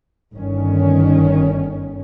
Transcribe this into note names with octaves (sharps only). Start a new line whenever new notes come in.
G1 D#3 C#4